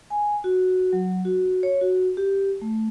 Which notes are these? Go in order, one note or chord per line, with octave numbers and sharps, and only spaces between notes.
G#5
F#4
F#3
F#4
C#5
F#4
G4
A3